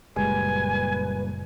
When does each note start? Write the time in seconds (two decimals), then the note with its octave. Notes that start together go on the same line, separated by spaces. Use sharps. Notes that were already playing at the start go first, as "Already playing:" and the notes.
0.16 F#1 A#2 G3 G#3 B4 G#5